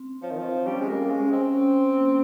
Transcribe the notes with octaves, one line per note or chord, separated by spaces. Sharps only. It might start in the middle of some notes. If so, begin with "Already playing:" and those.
Already playing: C4
F3 C#5
D#3
F3
G3 C#4
G#3
A#3
G#3 C#4
C4
C#4
A#3